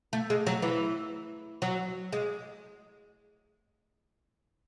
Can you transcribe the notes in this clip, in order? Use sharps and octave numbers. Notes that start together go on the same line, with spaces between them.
A3
G#3
F#3
E3
F#3
G#3